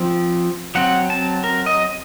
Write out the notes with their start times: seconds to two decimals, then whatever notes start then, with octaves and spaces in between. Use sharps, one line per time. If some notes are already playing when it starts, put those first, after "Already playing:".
Already playing: F3 C4
0.75 F#3 C4 F#5
1.10 A5
1.44 A#4
1.66 D#5